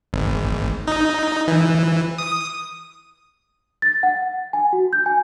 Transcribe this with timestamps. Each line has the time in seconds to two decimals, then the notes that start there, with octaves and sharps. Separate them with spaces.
0.13 G#1
0.87 D#4
1.48 E3
2.18 D#6
3.82 A6
4.03 F#5
4.53 G#5
4.73 F#4
4.93 G6
5.06 G#5